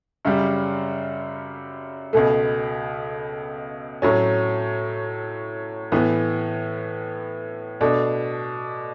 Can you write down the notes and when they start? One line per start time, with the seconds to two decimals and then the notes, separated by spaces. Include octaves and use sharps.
0.25 F#2 C#3 G3
2.13 C#2 B2 A3
4.02 A2 F#3 C#4
5.92 A2 E3 B3
7.81 B2 A3 D4